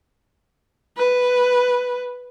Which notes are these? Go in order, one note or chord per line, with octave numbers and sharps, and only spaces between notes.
B4